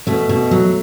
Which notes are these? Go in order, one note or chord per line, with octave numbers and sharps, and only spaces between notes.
B2 A3
B2
F#3